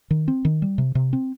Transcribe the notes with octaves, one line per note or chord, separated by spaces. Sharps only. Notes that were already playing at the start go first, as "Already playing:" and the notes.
D#3
C4
D#3
G3
C3
C3
C4